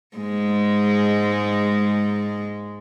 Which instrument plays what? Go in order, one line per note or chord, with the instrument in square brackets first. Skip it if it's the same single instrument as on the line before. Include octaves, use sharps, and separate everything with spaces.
[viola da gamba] G#2 G#3